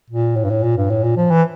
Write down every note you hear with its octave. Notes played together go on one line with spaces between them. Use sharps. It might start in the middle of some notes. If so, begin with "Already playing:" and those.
A#2
A2
G2
A2
A#2
G2
A2
A#2
F3
E3